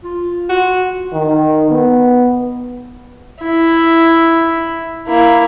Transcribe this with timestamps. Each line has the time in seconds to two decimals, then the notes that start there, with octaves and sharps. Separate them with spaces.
0.04 F4
0.49 F#4
1.13 D#3
1.71 B3
3.41 E4
5.07 A#3 E4